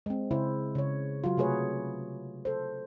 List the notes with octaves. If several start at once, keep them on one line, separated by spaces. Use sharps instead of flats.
G#3 C4
C#3 E4 C5
C#3 C#5
F#3 F4
C3 A3 G#4 B4 C#5
A4 C5